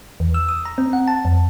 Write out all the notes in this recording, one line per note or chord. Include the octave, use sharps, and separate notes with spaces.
E2
E6
D#6
A#5
C4
F#5
A5
F2